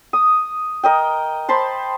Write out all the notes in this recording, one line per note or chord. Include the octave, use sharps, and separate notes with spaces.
D#6
A#4 D#5 G5
C5 A5 B5 C6